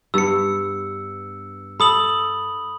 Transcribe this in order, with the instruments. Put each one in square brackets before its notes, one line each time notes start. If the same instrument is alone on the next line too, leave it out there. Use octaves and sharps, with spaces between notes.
[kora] G2 B3 [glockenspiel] E6 C#7
[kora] A4 [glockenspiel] B5 D#6 F#7